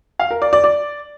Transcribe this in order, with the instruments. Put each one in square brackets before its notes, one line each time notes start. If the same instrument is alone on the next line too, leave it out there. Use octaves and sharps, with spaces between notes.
[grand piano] F5
A#4
D5
D5
D5